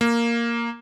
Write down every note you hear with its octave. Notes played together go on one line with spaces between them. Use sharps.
A#3